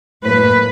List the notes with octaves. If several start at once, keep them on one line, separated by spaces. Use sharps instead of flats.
A2 F#3 A#3 B4